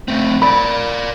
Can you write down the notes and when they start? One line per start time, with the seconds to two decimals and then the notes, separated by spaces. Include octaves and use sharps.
0.08 A3 C4
0.42 A#4 D5 B5